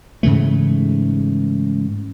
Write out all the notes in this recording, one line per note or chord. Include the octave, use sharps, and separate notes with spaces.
G#2 C#3 E3 A3